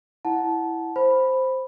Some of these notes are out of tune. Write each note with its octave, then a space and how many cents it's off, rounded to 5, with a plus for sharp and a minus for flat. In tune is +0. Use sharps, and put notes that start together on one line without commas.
E4 +0 F#5 +0 A5 -20
C5 +0 B5 +0